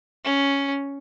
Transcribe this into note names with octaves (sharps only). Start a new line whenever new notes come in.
C#4